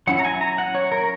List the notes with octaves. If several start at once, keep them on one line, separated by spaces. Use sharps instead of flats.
F#3 C#4 E4 F#5
A#5
G#5
A#5
F#5
C#5
A#4